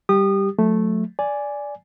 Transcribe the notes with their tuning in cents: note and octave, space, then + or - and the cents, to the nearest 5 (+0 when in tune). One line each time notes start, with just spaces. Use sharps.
G3 +5 G4 +0 D#6 -30
F#3 -35 A3 -5
D5 -10 G#5 +0